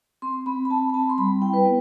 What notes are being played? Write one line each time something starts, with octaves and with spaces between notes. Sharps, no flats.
C4 C6
C4 B5
B5
C4 A5
B5
C4 A5
C6
G3 B5
E4 G5
B4
B3